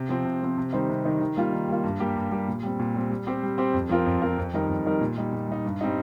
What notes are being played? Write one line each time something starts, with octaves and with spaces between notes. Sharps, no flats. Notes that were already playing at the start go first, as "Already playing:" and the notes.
Already playing: C3
F3 C4
C3
F3 C4
C3
D#3 G3 D#4 C5
C3
D#3 G3 D#4 C5
D#3
G3 A#3 F4
D#3
G3 A#3 F4
G2
G3 A#3 G4
G2
G3 A#3 G4
A#2
G3 C4
A#2
G3 C4
G3
C4 G4 C5
G3
C4 G4 C5
F2
F3 C4 F4 A#4
F2
F3 C4 F4 A#4
F2
D#3 G3 D#4 A#4
F2
D#3 G3 D#4 A#4
A#2
G3 D#4
A#2
G3 D#4
G2
G3 C4 D#4